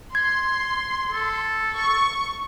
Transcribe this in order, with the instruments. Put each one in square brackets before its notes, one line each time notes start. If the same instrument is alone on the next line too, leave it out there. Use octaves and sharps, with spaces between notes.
[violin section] C6 [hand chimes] G#6
[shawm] A4
[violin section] C#6